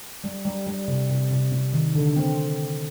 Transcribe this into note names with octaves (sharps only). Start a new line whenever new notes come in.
G3
G3
G3
C3
C3
C3
C3
D#3
D3
C4